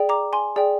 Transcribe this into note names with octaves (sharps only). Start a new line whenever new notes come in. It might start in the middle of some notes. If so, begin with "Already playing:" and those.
Already playing: G#4 D5 G5
A#5 D6
G#5 C6
G#4 D5 G5